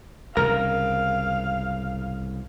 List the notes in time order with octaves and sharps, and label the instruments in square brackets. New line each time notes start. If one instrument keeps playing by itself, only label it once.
[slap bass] C2 G#2 C#3 [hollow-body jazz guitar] A#4 A#5 [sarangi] F5